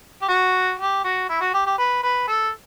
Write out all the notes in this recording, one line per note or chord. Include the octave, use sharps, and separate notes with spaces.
G4
F#4
G4
F#4
E4
F#4
G4
G4
B4
B4
A4